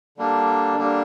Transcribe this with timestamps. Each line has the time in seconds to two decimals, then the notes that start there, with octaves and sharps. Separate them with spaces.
0.17 D3 G3 A#3 D4
0.76 D3 G3 A#3 D4